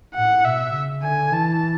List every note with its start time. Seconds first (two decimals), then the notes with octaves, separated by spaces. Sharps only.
0.14 A2 F#5
0.45 B2 E5
0.74 C#3
1.03 D3 G#5
1.32 E3 A5